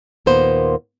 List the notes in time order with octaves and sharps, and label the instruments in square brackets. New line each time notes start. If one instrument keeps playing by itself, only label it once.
[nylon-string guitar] D#2 A#2 A#3 B3 C5